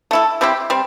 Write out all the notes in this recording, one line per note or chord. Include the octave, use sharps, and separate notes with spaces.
A3 E4 A4
G3 C4 E4 G4
G3 C4